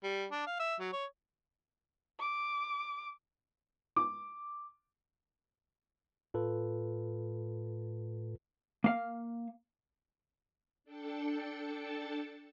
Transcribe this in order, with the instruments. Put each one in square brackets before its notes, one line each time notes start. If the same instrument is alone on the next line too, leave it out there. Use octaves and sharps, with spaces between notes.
[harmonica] G3
D4
F5
E5
F#3
C#5
[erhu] D6
[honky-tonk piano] D6
[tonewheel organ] A2 [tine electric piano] F4 A4 B4
[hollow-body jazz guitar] A#3 F5
[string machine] D4 A4 G5 A5 A6 C#7